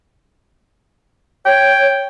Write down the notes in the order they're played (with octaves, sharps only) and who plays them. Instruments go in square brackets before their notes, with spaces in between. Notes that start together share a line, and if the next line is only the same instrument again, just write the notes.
[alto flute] C#5 [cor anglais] G5